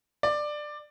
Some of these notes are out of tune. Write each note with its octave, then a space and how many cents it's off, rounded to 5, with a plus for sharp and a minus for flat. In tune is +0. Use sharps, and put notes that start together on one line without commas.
D5 +15